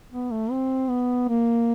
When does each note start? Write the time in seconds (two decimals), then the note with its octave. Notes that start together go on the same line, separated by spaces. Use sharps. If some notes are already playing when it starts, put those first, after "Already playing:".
0.11 B3
0.31 A3
0.51 C4
0.89 B3
1.29 A#3